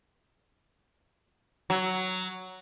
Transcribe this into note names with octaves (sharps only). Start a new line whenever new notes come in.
F#3